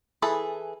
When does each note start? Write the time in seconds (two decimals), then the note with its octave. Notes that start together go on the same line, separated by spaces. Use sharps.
0.22 E3 G#4 A4 B5